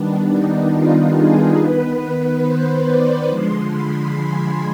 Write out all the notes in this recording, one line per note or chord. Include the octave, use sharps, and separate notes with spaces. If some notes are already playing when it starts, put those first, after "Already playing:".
Already playing: D#3 G3 B3 D4
D#4
F4
G#4
D#3 B3 B4
C5
D5
D3 F3 G#3 C6
B5
G#5